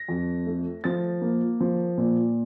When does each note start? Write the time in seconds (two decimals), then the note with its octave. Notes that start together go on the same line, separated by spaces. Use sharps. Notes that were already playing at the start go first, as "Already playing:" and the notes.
Already playing: A#6
0.08 F2
0.47 A3
0.84 F3 A6
1.22 A#3
1.60 F3
1.98 A#2